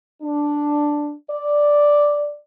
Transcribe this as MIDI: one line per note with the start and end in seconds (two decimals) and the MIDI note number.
0.23 1.14 62
1.31 2.38 74